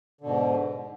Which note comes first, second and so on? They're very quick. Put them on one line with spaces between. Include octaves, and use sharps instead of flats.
D3 B2 G#2